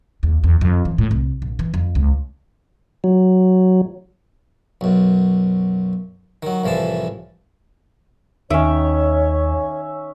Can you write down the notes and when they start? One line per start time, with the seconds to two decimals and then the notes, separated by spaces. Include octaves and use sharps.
0.23 D#2
0.44 E2
0.61 F2
0.85 E3
0.98 A2
1.11 C2
1.42 A#1
1.59 E3
1.74 F2
1.95 C#2
3.04 F#3
4.81 B1 F#2
6.43 D#3 F#3
6.63 C2 A2 E3 F3 A5
8.50 D#2 D#3 C#4 C#5 E5